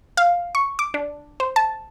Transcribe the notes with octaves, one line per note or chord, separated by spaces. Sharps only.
F5
C#6
D6
D4
C5
A5